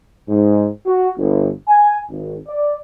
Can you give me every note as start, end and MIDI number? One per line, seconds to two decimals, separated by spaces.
0.29 0.68 44
0.86 1.10 66
1.18 1.50 31
1.68 1.99 80
2.10 2.37 32
2.48 2.77 74